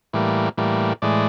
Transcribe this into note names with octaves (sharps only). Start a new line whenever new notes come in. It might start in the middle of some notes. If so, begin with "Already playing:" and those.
A2 E3 G3 A#3
A2 E3 G3 A#3
A2 E3 G#3 D5